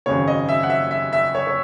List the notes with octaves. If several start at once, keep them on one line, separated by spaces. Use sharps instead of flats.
G#1 F#2 C#3 C#5
D#5
E5
F#5
E5
E5
E5
C#5
C#5